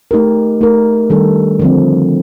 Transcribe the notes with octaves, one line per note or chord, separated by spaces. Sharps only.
A3 D#4 G4 A#4
A3 D#4 A#4
D#3 G3 D4 A4
D3 F3 C4